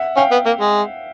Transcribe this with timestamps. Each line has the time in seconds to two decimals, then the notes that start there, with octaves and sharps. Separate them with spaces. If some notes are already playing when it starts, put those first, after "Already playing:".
Already playing: E5 F#5
0.17 C#4 F5 G5
0.31 B3
0.46 A#3
0.60 G#3